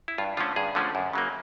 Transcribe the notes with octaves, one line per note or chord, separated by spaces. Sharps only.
E4
G2 F4
D3 F3 A3 C#4 F4
G2 G#4
D3 F3 A3 C#4
F#2
C#3 F#3 A#3